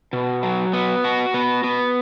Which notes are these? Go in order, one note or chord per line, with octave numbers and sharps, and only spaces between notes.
B2
F#3
B3
F#4
B3
B3